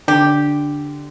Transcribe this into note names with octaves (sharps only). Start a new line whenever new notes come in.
D3 G4